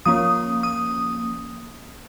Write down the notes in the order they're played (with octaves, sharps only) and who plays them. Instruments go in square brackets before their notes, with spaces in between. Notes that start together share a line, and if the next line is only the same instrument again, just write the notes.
[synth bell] F3 A#3 C#4 D#6
D#6